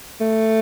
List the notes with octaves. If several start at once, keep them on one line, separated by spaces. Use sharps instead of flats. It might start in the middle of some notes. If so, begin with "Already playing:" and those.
A3